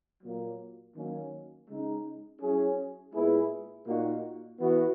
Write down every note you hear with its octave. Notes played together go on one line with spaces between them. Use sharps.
A#2 F#3 A#3
D#3 F#3 A#3 C#4
C#3 G#3 D#4
F#3 C#4 E4 G#4
A#2 G#3 B3 E4 G#4
A#2 A#3 D#4 F#4
E3 B3 F#4